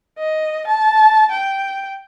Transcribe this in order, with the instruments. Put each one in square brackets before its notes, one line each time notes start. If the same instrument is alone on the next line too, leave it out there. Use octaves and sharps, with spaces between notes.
[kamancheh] D#5
A5
G5